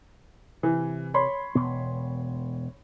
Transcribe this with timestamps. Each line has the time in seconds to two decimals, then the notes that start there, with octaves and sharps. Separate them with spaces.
0.63 C3 E3
1.14 C#5 B5 C6
1.55 E1 B2 B3